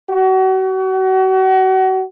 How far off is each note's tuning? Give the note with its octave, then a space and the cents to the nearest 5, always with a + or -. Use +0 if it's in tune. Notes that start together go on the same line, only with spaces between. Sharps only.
F#4 +35